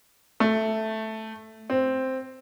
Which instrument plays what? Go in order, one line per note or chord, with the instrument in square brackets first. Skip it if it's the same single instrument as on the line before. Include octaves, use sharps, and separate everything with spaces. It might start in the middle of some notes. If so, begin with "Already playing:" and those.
[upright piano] A3
C4